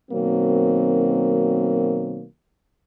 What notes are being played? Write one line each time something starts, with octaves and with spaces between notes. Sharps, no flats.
B2 D#3 F#3 A#3 C4